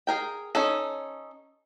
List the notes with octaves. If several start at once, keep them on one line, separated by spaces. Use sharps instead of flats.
G#4 A#4 G5
C#4 D#4 A4